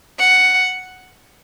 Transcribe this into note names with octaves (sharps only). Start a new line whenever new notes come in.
F#5